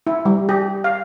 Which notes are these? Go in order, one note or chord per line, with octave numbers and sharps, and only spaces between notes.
E4
G3
G4
F5